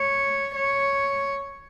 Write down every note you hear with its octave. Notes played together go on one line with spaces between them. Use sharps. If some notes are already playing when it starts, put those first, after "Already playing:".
Already playing: C#5
C#5